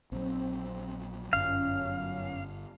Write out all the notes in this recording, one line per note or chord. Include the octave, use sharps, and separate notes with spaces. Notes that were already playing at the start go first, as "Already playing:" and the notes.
A#1 F#3 C4
G1 F#2 C#4 F5